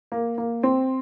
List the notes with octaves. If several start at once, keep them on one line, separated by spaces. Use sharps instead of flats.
A#3
A#3
C4